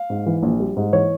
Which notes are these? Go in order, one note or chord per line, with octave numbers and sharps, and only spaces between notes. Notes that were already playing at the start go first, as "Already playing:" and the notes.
Already playing: F5
G#2
E3
A#1
G3
G#2
E3 C#5